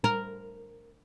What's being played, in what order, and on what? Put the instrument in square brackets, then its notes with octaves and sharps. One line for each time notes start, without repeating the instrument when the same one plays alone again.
[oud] A#4